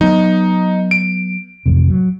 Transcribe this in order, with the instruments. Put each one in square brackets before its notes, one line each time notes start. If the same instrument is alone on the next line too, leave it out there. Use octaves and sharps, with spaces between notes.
[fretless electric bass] F#3 B3 [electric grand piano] D#4
[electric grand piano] D7
[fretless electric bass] A1 F2 C3
F#3